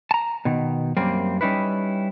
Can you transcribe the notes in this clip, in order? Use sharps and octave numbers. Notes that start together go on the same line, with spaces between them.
A5 A#5
B2 D#3
F#2 G3 A#3 C4
G3 C#4 D#4 E4 B4